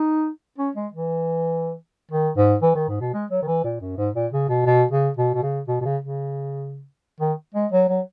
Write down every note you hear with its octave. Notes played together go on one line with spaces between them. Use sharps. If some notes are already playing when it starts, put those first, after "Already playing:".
Already playing: D#4
C#4
G#3
E3
D#3
G#2
E3
D#3
G#2
B2
G#3
F#3
D#3
E3
A#2
F#2
G#2
A#2
C#3
B2
B2
C#3
B2
B2
C#3
B2
B2
C#3
C#3
D#3
G#3
F#3
F#3